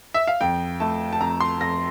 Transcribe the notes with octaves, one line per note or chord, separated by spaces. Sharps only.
E5
F5
F2 G5
A3 A5
A5
F2 A#5
C6
F2 A#6